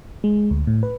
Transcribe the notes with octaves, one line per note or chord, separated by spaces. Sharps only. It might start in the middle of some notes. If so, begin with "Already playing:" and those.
G#3
D2
A2
B4